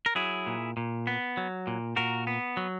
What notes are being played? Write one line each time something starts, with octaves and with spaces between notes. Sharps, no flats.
A#4
F#3 E4 G#4
A#2
A#2
B3
F#3
A#2
A#2 F#4 A#4
B3
F#3